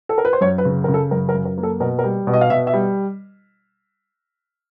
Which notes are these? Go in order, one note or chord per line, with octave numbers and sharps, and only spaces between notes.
A4
A#4
B4
C5
F#2 C#5
B4
C#3
C#3 A#4
A4
F#2 A#4
A#4
F#2
A#4
A#3
A4
B2 A#4
A#4
G3
B2
D#5
F5
B2 E5
E5
G3